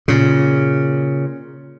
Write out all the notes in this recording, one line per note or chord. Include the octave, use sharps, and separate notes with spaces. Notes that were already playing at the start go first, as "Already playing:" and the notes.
A#2 C#3